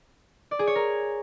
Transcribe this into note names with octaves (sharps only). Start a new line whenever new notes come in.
D5
G#4
C#5
A#4